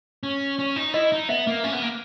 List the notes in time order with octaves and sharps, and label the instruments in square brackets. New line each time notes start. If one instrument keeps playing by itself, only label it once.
[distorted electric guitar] C#4
C#4
D#4
[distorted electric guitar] E4 [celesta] D#5
[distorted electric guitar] D#4
[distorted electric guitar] B3 [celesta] E5
[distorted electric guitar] A#3
C#4
B3
A#3